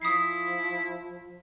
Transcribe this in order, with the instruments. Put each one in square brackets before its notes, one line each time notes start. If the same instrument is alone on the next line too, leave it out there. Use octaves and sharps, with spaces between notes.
[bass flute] F3 [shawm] E4 [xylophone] D#6 C7